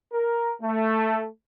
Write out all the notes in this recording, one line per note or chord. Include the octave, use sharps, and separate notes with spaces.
A#4
A3